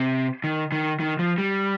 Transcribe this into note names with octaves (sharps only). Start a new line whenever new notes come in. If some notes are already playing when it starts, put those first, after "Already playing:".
Already playing: C3
D#3
D#3
D#3
F3
G3